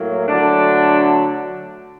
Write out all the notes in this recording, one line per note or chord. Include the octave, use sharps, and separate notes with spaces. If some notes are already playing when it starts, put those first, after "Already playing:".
Already playing: A2 F#3 A#3
D3 F#3 A3 D4